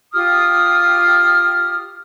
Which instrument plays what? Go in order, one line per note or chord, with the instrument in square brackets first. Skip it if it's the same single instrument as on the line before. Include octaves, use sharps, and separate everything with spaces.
[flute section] F4 G4 D#6 F6